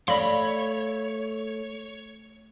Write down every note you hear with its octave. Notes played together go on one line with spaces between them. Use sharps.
A3 C#5 D5 F5 B5